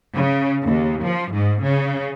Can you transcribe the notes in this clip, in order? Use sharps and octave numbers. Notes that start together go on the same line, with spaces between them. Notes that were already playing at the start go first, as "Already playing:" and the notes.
C#3
D#2
F3
G#2
C#3